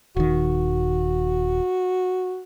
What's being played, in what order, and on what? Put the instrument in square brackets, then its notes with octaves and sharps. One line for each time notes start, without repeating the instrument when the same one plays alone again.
[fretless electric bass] D#1 D#3 [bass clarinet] F#4